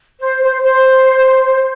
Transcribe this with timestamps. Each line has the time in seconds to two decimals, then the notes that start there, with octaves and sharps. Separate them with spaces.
0.19 C5
0.42 C5
0.63 C5